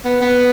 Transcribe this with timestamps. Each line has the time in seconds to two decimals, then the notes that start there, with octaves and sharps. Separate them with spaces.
0.05 B3
0.22 B3